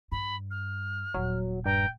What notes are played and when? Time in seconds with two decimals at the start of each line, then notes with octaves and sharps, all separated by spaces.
0.12 G2 B5
0.51 F6
1.14 D#1 F#3
1.66 G2 G5 A#5